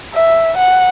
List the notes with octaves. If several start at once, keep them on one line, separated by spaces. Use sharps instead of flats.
E5
F#5